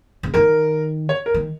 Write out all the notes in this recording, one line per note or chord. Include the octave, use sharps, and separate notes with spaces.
C#3
D#3 A#4
C#5
A#4
D#3